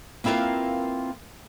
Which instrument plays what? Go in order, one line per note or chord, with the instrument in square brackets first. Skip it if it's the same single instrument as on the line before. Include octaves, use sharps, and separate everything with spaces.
[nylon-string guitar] A#3 C4 E4 F4 A#4 B4